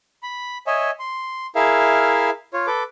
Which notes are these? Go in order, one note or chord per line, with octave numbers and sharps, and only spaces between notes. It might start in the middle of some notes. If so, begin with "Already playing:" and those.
B5
C#5 D#5 E5 G#5
C6
E4 G#4 A#4 E5 F5
F4 C#5
A4 B4 D6